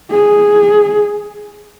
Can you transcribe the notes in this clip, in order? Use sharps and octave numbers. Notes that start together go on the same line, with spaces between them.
G#4